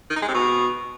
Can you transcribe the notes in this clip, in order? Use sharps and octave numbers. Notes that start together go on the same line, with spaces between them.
D#3
D#4
G#3
C3
B2